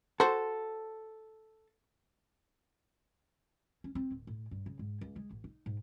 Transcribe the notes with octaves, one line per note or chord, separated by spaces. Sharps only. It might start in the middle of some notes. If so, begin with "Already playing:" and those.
F#4 A4 C5
C#4
C4
D1
A2
G2
C#3
G#2
C#2
G#3
A1
D#4
G#2